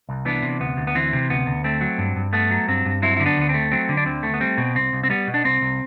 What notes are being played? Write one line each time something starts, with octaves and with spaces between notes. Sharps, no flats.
C2
E3 B3 D4
C3
D2 B3
D2
B3
E3 C4
C3
D2 B3
D2
A3 C4
F#3
G2
G2
A3 B3
F#3
G2 C4
G2
F#3 C4 E4
D3 E4
B3 D4
D2 B3
C4
A3
F#3 C4
D3
D4
D2 C4
A3
B3
G3 C4
B2
C2 C4
C2
C4
G3 B3
B2
D4
C2 C4
C2